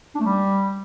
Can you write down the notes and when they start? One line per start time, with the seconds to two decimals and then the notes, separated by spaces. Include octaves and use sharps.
0.15 D4
0.20 A3
0.26 G3